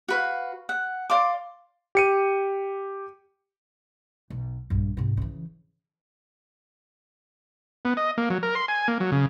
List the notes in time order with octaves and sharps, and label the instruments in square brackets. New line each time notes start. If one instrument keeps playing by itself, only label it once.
[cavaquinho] F#4 B4 F5
F#5
D5 F5 C6 D6
[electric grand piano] G4 C#7 D#7
[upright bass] B1
A#1 G2
G#2 C3
C#3 E3
[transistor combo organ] B3
D#5
A#3
F#3
A#4
C6
G#5
A#3
F#3
C#3